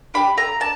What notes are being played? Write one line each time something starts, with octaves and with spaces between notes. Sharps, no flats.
D4 G4 B5
A3 A#5
D4 A5